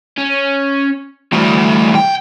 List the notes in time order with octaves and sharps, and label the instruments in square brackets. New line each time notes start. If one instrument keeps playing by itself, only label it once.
[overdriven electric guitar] C#4
[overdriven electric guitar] E3 G3 [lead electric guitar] A3 F#4
[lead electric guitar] B1 G5